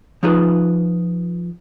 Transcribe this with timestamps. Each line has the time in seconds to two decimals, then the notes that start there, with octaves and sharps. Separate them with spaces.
0.23 F3 D#4 F4 G#4 B4